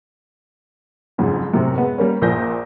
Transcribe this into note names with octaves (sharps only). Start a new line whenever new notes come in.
F2 G#2 C#3 F#3
F#2 A2 C3
G#3 B3
G3 A#3 C#4
A#1 A#2 F3 G#5 G6 A#6